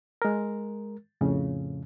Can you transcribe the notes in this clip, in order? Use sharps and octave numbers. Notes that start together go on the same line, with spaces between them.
G#3 A#4
F2 A2 C#3